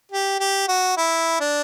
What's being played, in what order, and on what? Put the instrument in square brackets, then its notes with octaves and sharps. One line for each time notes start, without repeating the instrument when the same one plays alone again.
[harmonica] G4
G4
F#4
E4
D4